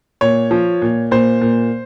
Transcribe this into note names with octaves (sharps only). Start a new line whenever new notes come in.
A#2 C#5
F3
A#2
A#2 C5
A#2